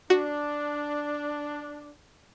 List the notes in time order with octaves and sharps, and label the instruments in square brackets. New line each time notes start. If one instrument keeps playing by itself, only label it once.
[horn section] D4 [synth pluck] F#4